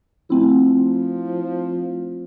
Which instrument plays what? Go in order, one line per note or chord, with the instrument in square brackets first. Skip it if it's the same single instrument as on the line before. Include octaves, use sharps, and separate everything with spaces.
[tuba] F3 [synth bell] A3 C4 E4